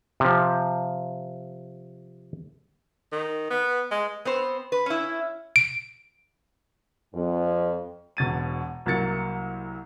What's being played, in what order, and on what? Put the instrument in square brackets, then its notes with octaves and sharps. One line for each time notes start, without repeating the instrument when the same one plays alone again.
[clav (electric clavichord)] C3 F3
[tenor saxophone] D#3
B3
G#3
[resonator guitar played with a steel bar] B3 C4 C5
B4
C#4 E4
[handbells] D7
[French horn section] F2
[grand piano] E1 B2 A6 D#7
C2 F#3 A#3 A6 C#7